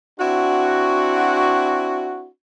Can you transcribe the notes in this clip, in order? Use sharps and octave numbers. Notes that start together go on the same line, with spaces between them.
C4 D4 E4 F#4